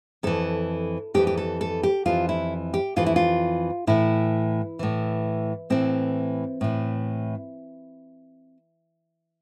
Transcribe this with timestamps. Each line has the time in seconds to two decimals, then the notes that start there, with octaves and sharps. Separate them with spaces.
0.23 F2 E3 A4
1.14 F2 E3 G4
1.27 G4
1.37 A4
1.61 A4
1.83 G4
2.06 F2 E3 F4
2.29 E4
2.74 G4
2.96 F2 E3 F4
3.06 E4
3.16 F4
3.87 A2 E3 E4
4.79 A2 E3
5.70 A2 E3 C4
6.61 A2 E3